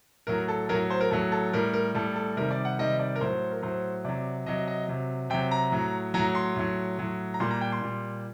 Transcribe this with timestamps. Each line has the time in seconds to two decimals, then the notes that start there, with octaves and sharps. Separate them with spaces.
0.27 A2 F#3 A#4
0.48 A4
0.69 A2 F#3 A#4
0.90 C5
1.01 A#4
1.11 A2 F#3 A4
1.32 A4
1.53 A2 G3 A#4
1.73 A#4
1.94 A2 G3 A4
2.16 A4
2.37 C3 D#3 G3 A#4
2.51 D5
2.65 F#5
2.79 C3 D#3 G3 D#5
2.99 D5
3.16 A#4
3.21 A2 F#3 C5
3.51 A#4
3.62 A2 F#3 C5
4.04 C3 F#3 D5
4.46 C3 F#3 D#5
4.67 D#5
4.88 C3 F#3
5.30 C3 F#3 G5
5.51 A#5
5.72 A2 F#3
6.14 A2 F#3 A#5
6.35 C6
6.56 A2 F#3
6.99 A2 F#3
7.34 A#5
7.40 A#2 G3 C6
7.50 A#5
7.61 G5
7.72 C6
7.81 A#2 G3